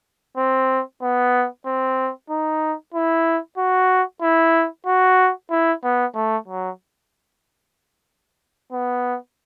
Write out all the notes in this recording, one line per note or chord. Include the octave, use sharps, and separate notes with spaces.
C4
B3
C4
D#4
E4
F#4
E4
F#4
E4
B3
A3
F#3
B3